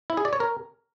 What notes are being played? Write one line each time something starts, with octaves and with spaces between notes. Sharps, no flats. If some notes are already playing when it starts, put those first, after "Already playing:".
E4
G#4
D5
C#5
A#4